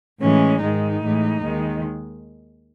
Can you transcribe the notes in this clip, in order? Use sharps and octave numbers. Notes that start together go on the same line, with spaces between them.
A2 E3 G#3 C#4
G#2 D#3 G#3 D#4
A2 E3 G#3
D#2 D#3 G#3